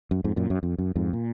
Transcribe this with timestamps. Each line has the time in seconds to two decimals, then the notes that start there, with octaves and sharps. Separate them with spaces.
0.11 F#2
0.24 F2 G#2
0.36 F#2 A#2
0.50 F#2
0.63 F2
0.78 F#2
0.96 F2 G#2
1.13 A#2